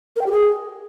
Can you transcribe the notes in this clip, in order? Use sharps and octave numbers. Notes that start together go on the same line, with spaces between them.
A#4
G5
G4
G#4